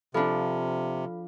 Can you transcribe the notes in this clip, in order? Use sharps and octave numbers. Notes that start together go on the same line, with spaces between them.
C3 F3 D4 A4 F5 B5